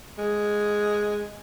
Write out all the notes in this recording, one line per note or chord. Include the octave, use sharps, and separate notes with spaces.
G#3